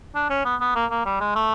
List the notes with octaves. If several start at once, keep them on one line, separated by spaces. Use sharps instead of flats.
D4
C#4
B3
B3
A#3
A#3
G3
G#3
A3